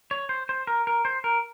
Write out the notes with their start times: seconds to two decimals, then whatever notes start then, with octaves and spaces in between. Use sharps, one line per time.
0.11 C#5
0.29 C5
0.49 C5
0.67 A#4
0.87 A#4
1.05 C5
1.24 A#4